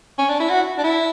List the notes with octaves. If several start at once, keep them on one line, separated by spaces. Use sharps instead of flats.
C#4
D4
E4
F#4
D4
E4